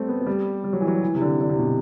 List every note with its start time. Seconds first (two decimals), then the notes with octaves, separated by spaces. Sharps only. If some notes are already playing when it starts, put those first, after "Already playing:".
Already playing: G3 A3 C4
0.09 B3
0.21 A3
0.26 G3
0.64 G3
0.73 F#3
0.81 E3
0.88 F#3
1.03 E3
1.15 C3
1.21 D3
1.41 D3
1.49 C3
1.59 B2